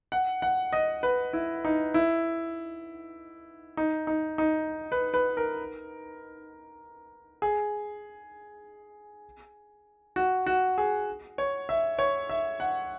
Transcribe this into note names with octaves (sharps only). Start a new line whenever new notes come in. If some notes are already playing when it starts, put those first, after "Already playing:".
F#5
F#5
D#5
B4
E4
D#4
E4
D#4
D#4
D#4
B4
B4
A#4
G#4
F#4
F#4
G#4
C#5
E5
C#5
E5
F#5